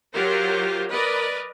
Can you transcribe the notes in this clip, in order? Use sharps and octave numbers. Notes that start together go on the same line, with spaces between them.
F#3 F4 G4 A#4 C5
A#4 B4 D5 D#5